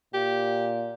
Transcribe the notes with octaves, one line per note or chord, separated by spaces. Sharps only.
A#2 G4